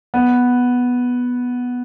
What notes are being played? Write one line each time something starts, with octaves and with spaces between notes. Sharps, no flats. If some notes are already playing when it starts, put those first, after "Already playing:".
B3